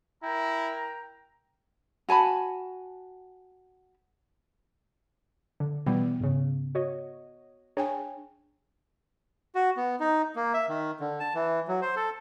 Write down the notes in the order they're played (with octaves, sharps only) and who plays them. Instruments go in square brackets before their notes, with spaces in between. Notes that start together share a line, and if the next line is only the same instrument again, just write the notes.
[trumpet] E4 [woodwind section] A#4 G5 A#5
[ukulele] F#4 G#5 A5 B5
[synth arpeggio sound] D3
[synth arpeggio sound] B2 E3 G3 [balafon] B3
[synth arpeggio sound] G#2 C#3
F#4 C#5 D#5
[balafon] D4 G5 G#5 [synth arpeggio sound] G#4 C#5
[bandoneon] F#4
B3
D#4
A#3
E5
D#3
D3
A5
E3
F#3
C5
A4